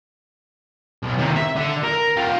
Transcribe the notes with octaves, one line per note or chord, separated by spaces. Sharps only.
B1
C3 D#3
E5
D3
A#4
F4 G4